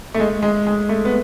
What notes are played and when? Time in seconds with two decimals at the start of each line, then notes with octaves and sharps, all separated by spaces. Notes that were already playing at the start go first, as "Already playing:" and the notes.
0.14 A3
0.20 G#3
0.43 G#3
0.67 G#3
0.89 A3
1.05 B3